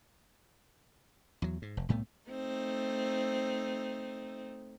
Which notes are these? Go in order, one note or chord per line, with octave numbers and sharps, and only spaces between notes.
E2 F#3
G#2
F1
C2 A2 A3 B3
A3 C4 D#4